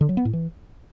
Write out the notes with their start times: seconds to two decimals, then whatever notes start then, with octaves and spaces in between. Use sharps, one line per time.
0.01 D3
0.09 F#3
0.17 B3
0.25 A2
0.33 E3